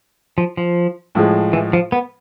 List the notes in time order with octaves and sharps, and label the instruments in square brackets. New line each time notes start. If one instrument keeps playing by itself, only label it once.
[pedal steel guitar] F3
F3
[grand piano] A2 F3 G#3
[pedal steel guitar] E3
F3
B3